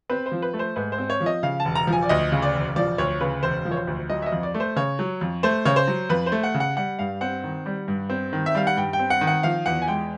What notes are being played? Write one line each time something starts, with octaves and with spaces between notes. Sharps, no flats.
C4 B4
C5
F3
B4
A3
C5
G#2 B4
C5
C4
C#5
F3
D#5
C#3 F5
A5
E1
A#5
F3
G#5
D5
D2 D#5
C#3
D5
E1
F3 D5
D2 C#5
C#3 B4
E1 C5
F3
C#5
C5
D2
F#3 D#5
E5
D#5
F2
D5
A3
C5
C#3 C#5
F#3
F2
A3 C5
C#3 C#5
C5
F#3
F2 B4
C5
A3
F#5
C#3
F#5
G3 F#5
G2 F5
C4 F#5
D#3
G3
G2
C4
D#3
E5
G3 F5
F#5
G2 G5
G5
C4
F#5
D#3
F#5
F3 F5
E2 F#5
G#5
G#3 G5